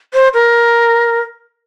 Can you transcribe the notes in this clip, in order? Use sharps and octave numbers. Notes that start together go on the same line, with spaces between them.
C5
A#4